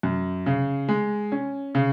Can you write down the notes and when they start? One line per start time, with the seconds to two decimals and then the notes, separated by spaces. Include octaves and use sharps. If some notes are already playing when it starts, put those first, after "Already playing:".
0.03 F#2
0.46 C#3
0.89 G#3
1.32 C#4
1.75 C#3